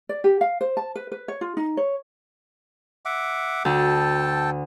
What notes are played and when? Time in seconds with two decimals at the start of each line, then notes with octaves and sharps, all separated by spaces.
0.09 D5
0.24 G4
0.41 F5
0.61 C5
0.77 A5
0.95 B4
1.12 B4
1.28 C#5
1.41 F4
1.57 D#4
1.77 C#5
3.05 E5 F#5 D6
3.65 D2 A4 G5 A5